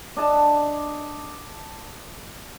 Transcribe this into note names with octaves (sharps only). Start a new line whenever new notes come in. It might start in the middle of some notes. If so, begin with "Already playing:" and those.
D4 D#5 A5